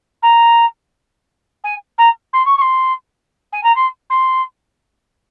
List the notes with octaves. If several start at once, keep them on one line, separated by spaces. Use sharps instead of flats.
A#5
G#5
A#5
C6
C#6
C#6
C6
G#5
A#5
C6
C6